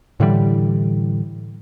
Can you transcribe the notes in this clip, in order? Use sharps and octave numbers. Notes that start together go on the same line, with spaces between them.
A2 D3 E3 G3